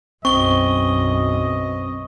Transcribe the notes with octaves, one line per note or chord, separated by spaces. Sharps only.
B1 F#2 C4 D#5 C#6 G7